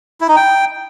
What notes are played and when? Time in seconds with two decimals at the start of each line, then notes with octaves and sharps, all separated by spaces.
0.21 E4
0.28 D#4
0.36 G5